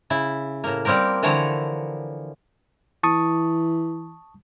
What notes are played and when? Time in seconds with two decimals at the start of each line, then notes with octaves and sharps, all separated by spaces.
0.10 C#3 E4
0.64 A2 A#3
0.85 G3 A#3 C4 G4 A#4
1.23 D3 E3 F3 C#5 A#5
3.03 E3 A5 C#6 D#6